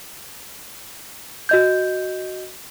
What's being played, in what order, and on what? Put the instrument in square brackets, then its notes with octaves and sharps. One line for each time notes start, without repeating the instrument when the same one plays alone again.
[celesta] F#4 D#5 G6